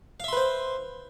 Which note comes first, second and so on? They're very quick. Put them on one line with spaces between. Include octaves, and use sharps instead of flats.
F5 E5 C6 B4 C5